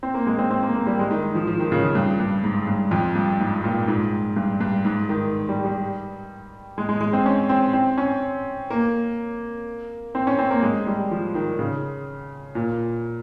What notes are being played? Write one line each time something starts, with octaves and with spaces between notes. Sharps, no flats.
C4
A#3
G#3
C4
C4
A#3
A#3
G3
G#3
D#3
D#3
F3
F3
D#3
C#3
F3
G2
G2
G#2
G2
F2
G2
G#2
A#2
G#2
G2
G2
G#2
D#3
G3
G3
G#3
G#3
G#3
C4
C#4
C4
C4
C#4
A#3
C4
C#4
C4
A#3
G#3
G3
F3
D#3
C#3
A#2